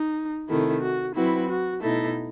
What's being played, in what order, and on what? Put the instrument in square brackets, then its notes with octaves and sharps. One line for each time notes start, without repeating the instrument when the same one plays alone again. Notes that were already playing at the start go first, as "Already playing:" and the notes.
Already playing: [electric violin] D#4
[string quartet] C3 D#3 A3 [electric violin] E4
[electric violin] F#4
[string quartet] F#3 C4 F#4 B4 [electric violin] E4
[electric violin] F#4
[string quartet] B2 A3 D#4 [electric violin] E4